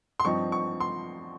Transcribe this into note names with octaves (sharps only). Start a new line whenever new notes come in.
C6
G2 F3 C4 D#4 C#6
C#6
C6